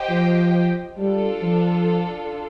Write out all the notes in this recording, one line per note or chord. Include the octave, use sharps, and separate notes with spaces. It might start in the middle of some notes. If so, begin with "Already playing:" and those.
Already playing: G4 C5 D#5 G5
F3
G3 D4 F4 A4
F3